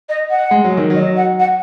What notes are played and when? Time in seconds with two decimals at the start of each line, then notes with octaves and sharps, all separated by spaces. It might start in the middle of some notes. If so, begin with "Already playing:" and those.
0.09 D#5
0.30 F#5
0.51 G#3
0.65 F#3
0.77 D#3
0.90 F#3 D#5
1.16 F#5
1.39 F#5